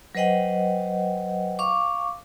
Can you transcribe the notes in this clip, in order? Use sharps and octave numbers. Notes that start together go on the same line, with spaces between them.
F#3 B4 C5 D#5 F#5 G5
F5 C#6 D6